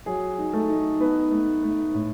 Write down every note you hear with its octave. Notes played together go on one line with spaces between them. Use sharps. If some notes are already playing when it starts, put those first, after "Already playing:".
F#3 G#4
D#4
A3 A4
D#4
B3 D#4 B4
A3
A3
A2